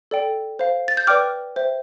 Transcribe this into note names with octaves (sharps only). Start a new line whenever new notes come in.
A4 D5 G5
C5 F5
A6
G6
B4 D5 G5 D6 F6
C5 E5 G5